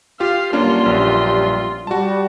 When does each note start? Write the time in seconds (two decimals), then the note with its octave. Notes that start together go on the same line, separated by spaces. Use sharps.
0.20 F4 G4 F5
0.53 F#2 B2 G3 A#3 C#4 D4 F4
0.86 A#1
1.87 G3 F#4 A5